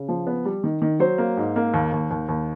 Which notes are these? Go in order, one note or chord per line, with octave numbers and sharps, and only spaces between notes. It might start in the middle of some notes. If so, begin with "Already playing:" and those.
Already playing: C#3
F3
B3
G3
D#3
D#3
F#3 C5
A#3
G#2
A#3
D#2
D#2
D#2
D#2